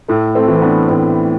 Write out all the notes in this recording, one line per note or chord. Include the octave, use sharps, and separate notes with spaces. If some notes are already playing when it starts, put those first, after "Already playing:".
A2 A3
A3 C4
E3
C4
B3 D4
A2 A3 C4